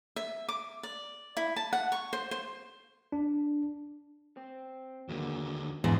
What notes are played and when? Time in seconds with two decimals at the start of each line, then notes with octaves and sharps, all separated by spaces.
0.16 E5
0.49 D6
0.83 D5
1.37 E4
1.56 A5
1.73 F#5
1.92 C#6
2.13 C5
2.31 C5
3.12 D4
4.37 C4
5.09 D#2 D3 F#3 G#3 A#3
5.84 E2 G#2 D3 C4